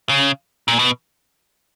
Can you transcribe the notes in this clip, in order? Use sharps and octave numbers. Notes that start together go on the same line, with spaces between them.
C#3
A#2
B2